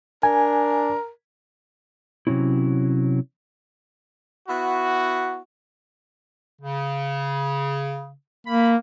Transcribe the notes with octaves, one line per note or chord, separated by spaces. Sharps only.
D4 A#4 G#5
C3 F3 F#3 C#4 E4
B3 E4 F#4
C#3
A#3 B5